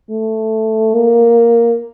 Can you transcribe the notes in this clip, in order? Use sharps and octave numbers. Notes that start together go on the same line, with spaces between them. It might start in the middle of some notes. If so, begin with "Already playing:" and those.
A3
A#3